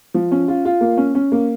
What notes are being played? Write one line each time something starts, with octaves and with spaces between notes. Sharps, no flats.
F3
C#4
F4
F4
A#3
C#4
C#4
A#3